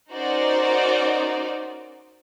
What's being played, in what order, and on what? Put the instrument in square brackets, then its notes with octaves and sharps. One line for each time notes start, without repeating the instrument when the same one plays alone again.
[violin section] C#4 D#4 F#4 A#4 C5 D5